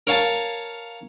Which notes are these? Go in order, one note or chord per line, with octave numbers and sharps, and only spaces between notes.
A#4 C#5 F5 G#5 A5